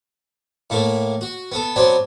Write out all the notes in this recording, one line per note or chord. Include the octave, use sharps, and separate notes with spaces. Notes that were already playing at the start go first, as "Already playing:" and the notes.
A2 A3 A#3
F#4
B3 A4
F#3 B3 C4 D4